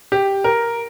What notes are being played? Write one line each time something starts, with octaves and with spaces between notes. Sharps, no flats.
G4
A#4